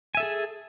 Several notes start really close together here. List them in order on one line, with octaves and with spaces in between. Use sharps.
G#5 E5 A4 G#4